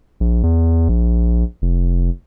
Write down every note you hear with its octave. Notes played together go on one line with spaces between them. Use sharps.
A#1
E2
A#1
F1